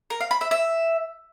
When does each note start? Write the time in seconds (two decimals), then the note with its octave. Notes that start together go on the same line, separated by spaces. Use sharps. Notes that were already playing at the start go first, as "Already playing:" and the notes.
0.10 A#4
0.21 F5
0.31 B5
0.41 E5
0.51 E5